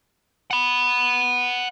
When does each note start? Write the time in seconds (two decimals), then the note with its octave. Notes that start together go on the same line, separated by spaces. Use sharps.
0.51 F#5 B5